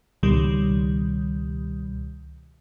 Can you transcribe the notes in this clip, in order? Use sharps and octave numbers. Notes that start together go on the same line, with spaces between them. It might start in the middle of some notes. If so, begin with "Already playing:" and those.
C#2 B2 D#3 G3